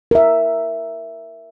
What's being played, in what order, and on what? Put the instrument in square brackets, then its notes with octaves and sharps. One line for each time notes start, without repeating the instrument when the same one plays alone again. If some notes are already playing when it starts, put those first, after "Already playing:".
[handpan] A#4 E5